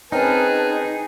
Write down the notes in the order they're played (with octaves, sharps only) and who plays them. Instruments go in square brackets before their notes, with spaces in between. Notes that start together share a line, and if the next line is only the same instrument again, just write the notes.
[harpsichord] C4 C#4 A#4 [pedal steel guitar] D#4 [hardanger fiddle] G#4 [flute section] B4 A5